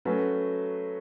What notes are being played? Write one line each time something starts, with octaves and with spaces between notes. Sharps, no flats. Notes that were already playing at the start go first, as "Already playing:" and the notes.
F#3 A3 C#4 F#4 B4